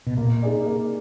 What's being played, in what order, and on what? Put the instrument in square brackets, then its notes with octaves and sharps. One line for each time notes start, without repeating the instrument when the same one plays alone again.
[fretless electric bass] B2
[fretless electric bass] A#2 [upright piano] A#3
[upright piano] D#4 G#4 D5
A#3